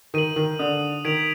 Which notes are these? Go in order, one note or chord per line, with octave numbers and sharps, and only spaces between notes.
D#3 D#7 F#7
D#3
D3 D#6
D#3 G#6 B6 D7 F7